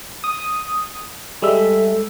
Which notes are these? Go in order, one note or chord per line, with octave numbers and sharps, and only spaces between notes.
D#6
G3 G#3 A4 E5